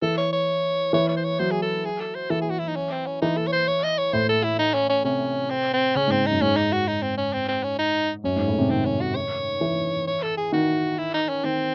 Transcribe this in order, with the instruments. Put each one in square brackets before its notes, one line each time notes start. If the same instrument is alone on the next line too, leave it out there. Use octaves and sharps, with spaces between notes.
[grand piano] E3 [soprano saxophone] A4
[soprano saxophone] C#5
C#5
[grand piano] E3 [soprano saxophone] C#5
[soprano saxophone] C#5
C5
C#5
[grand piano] F#3 [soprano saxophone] C5
[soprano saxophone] G#4
A4
G#4
A4
C5
[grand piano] E3 [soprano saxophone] A4
[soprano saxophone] G#4
F#4
E4
D#4
C#4
C4
C#4
[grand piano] E3 [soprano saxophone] D#4
[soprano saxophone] A4
C#5
C5
C#5
D#5
C#5
[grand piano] A2 [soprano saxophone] C5
[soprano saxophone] A4
E4
D#4
C#4
C#4
[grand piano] C3 [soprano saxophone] C#4
[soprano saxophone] C4
C4
[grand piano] C#3 [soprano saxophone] C#4
[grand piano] G#2 [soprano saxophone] C4
[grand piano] F#2 [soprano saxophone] D#4
[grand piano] G#2 [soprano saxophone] C#4
[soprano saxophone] D#4
F#4
D#4
C4
C#4
C4
C4
C#4
D#4
[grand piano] F#2 [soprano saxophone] C#4
[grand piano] G#2
A2
C3
[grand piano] D#3 [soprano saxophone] C4
[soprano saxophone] C#4
F#4
C#5
[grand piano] E3
[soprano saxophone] C#5
A4
G#4
[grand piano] D#3 [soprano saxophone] F#4
[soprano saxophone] E4
D#4
C#4
[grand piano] D#3 [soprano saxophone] C4